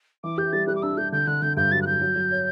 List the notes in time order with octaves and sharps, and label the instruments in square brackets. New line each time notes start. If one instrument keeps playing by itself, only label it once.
[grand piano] E3 [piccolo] D6
[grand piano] G4 [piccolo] G6
[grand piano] G3 [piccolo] A6
[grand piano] G3 [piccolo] F#6
[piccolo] D6
[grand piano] D4 [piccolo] E6
[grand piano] G3 [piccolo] G6
[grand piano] D3 [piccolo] G6
[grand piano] D3 [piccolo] F#6
[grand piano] D3 [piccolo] G6
[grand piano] G2 [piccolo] G6
[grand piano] F#3 [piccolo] A6
[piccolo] F#6
[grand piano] F#3 [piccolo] G6
[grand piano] F#3
F#3
C#5